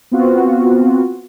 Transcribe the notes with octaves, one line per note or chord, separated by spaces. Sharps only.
B3 C4 F4 F#4